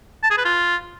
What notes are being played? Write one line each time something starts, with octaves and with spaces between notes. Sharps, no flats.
A5
G#4
B4
F4